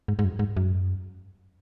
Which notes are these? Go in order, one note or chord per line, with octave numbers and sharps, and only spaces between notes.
G#2
G#2
F#2
G#2
F#2